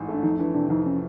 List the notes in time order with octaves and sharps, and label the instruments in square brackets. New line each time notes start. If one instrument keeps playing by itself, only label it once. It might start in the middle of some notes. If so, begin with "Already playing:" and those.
Already playing: [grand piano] A1 G#2
A3
[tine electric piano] D4
[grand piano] F2 [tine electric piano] D#4
[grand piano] E3 [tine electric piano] D4
[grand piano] C3 [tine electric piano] D4
[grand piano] F2 [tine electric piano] D#4
[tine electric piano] C#4